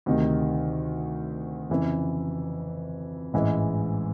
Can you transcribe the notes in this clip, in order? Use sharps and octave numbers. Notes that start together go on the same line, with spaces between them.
D2 C3 D#3
F2 C#3 E3
A1 G#2 E3 G#3